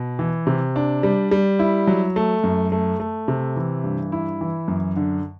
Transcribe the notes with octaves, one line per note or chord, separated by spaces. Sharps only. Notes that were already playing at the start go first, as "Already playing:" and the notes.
Already playing: B2
E3
C3
D4
G3
G3
E4
F#3
A3
F#2
A3
A3
C3
E3
G2
E4
E3
F#2
D3